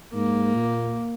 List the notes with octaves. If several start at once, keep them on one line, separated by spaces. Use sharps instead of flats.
G#2 A#3
A#2